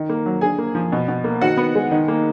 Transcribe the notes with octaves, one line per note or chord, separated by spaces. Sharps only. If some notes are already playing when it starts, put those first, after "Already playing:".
Already playing: D#3
A#3
F#3
D3 G#4 G#5
A#3
F3
B2
B2
A#3
D#3 F#4 F#5
B3
G#3
D#3
A#3